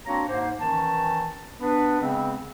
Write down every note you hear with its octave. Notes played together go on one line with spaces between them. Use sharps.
A#3 C4 D4 F#4 C#5 A#5
G#2 A#3 C5
D#3 E3 C#4 A5
B3 D4 B4
C#3 G#3 B3 C4